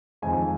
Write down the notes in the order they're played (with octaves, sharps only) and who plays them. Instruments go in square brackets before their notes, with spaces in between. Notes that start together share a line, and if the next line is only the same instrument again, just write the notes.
[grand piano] F2 D#3 G#3 G#5